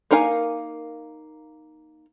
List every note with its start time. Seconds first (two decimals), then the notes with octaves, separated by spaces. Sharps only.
0.11 A#3 D#4 A#4 F5 G#5